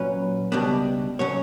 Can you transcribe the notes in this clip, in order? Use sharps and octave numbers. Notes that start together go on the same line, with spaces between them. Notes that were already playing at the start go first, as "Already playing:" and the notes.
Already playing: A#2 F#3 C#4 B4
C#2 B2 G3 B3 D4
B2 F#3 C#4 C#5